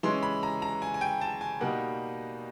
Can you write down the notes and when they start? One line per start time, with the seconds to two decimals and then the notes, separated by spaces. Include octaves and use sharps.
0.03 E3 G#3 C#4 C6
0.23 B5
0.43 A#5
0.62 A#5
0.82 G#5
0.94 G#5
1.01 G5
1.21 A5
1.41 G#5
1.61 B2 G3 A#3 D#4 F#5